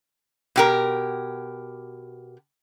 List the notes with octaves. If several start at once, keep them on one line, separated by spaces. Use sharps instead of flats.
B2 G4 A#4